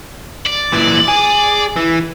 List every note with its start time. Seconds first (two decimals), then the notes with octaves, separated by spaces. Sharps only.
0.47 D5
0.72 A#2 E3
1.08 G#4
1.76 E3